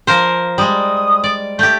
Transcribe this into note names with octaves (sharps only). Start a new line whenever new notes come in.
F3 A#4 C5
G3 G#3 D#6
D5
A3 G4 G6